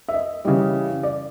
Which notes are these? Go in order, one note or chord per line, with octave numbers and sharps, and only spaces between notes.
E5
D#5
C#3 E3 G3 D#5
D5